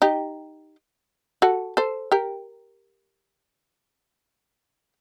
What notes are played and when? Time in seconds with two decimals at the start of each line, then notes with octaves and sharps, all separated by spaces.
0.02 D#4 G4
1.42 F#4 A4
1.77 A4 C5
2.12 G4 A#4